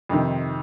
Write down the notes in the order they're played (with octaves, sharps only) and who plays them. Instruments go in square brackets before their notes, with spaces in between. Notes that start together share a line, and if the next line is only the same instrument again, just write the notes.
[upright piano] F2 C3 D#3